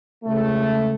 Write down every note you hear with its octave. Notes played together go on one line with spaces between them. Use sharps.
C#2 A3